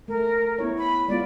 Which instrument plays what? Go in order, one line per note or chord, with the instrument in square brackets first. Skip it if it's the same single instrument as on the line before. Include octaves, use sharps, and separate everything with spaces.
[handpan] A3 [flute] A#4
[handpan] B3 E4 C#5
[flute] B5
[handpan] G#3 B3 F4 [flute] D5